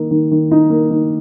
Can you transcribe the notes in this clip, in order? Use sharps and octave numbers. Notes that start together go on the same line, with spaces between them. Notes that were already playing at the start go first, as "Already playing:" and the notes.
Already playing: D#3 A#3 D#4
D#3
D#3
D#4
A#3
D#3